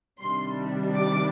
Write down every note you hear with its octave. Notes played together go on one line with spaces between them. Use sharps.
C3 D#3 G3 D4 C6
D6